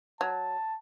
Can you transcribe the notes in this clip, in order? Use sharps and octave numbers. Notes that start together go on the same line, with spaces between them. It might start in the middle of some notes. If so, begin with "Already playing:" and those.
F#3 A5